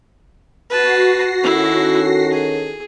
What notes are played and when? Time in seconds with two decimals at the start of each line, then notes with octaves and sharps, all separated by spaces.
0.70 F#4 B4 A5 A#6 C7
1.43 D#3 C#4 E4 A4
2.31 G#4